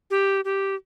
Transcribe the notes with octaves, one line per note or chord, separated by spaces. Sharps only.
G4
G4